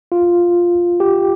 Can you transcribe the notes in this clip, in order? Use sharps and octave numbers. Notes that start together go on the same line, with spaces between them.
F4
G4